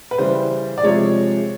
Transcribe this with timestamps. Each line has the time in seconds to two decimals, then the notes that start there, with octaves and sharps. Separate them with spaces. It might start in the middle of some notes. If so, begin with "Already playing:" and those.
0.11 B4
0.18 C#3 E3 G3 C5
0.78 D5
0.83 C3 F3 G#3 C#5